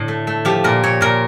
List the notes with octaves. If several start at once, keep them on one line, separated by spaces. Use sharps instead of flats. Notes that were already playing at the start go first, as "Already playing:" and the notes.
Already playing: A2 D3 A4
A3
A3
F3 G4
A#2 A#4
A#2 C#5
A#2 A#4